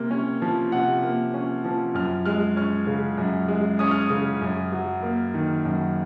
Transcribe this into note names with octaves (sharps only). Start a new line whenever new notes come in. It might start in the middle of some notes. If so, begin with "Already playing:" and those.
Already playing: C3 A#3
C#4
F3
C3 F#5
A#3
C#4
F3
F#2 F6
G#3 F6
C#4 F6
C#3
F#2
G#3
C#4 D#6
F6
D#6
C#3
F#2
F#3
A#3
D#3
F#2